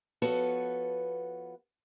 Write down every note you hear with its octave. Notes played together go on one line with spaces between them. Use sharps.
F3 B3 F#4 A4 B4 C#5